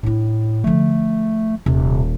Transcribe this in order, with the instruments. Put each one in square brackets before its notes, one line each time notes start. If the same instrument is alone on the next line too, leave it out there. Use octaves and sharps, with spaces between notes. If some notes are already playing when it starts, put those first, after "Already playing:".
[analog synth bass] A2 [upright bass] D4 E4
[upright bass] D3 F3 [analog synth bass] A3
[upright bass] D#1 [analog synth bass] C3